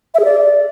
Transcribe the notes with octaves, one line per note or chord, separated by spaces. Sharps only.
E5
G#4
D5